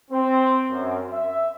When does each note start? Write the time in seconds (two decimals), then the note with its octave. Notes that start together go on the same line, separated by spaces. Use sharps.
0.11 C4
0.71 F#2
1.13 E5